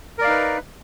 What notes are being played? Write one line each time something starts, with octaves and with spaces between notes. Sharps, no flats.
D#4 A#4 B4 D5 F5